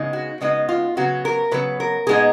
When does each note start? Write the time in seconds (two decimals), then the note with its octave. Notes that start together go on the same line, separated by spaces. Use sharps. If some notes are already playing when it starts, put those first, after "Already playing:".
Already playing: C#3 G#3 B3 D#4
0.13 F#4
0.41 C#3 G#3 B3 D#4 D#5
0.69 F4
0.97 C#3 F#3 B3 F#4
1.25 A#4
1.51 C#3 F#3 B3 B4
1.80 A#4
2.07 A#2 G#3 B3 D#4 G#4